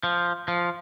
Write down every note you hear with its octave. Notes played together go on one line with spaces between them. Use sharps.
F3
F3